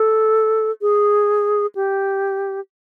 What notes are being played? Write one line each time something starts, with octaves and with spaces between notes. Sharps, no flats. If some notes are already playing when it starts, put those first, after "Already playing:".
Already playing: A4
G#4
G4